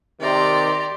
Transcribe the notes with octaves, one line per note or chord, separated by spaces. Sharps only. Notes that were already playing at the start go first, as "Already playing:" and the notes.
C3 D#3 G4 D5 A#5 C6